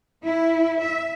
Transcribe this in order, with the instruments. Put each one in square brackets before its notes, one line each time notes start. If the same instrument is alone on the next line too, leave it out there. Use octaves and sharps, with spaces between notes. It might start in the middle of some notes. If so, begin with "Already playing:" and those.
[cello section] E4
E5